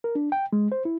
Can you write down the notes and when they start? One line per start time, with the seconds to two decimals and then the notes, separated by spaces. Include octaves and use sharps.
0.04 A#4
0.15 D4
0.32 G5
0.53 G#3
0.72 C5
0.85 E4